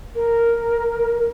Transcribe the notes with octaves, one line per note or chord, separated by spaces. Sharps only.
A#4